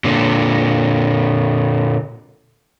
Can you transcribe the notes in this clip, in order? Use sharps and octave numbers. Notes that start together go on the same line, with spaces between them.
A#2 D3